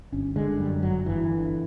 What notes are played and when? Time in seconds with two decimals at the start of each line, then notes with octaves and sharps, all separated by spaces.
0.12 G1 C#4
0.36 D3 G#3
0.59 F#2 G3
0.82 G1 F#3
1.06 G1 E3
1.30 D3